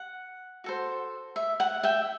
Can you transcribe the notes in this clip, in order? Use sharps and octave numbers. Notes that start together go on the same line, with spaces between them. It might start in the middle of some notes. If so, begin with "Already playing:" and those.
Already playing: F#5
F#4 A4 C5
E5
F#5
E5 G5